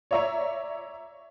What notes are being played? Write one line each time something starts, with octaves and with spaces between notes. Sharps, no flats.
C#5 D5 E5 A#5 C#6